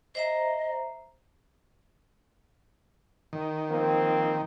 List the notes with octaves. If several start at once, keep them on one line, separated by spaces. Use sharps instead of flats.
C5 D#5 E5 A#5
D#3
F3 A#3 C4